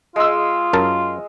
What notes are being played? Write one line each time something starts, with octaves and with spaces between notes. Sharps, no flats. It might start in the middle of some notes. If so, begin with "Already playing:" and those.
G#3 F4 E6
F#2 A#4 A5